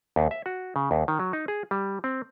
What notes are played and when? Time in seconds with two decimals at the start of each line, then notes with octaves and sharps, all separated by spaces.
0.16 D#2
0.31 E5
0.46 F#4
0.76 C#3
0.91 D#2
1.08 D#3
1.19 F#3
1.33 D#4
1.48 G#4
1.71 G3
2.04 C4